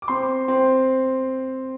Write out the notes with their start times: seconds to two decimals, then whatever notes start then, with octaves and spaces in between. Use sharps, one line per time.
0.02 D6
0.08 C4 C6
0.48 C4